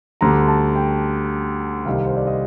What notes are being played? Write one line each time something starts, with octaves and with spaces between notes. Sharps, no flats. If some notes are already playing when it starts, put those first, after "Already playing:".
D2 D3 G3 A#5
A5
G5
C2 C3 D#3 G3 F5
C5
D5
D#5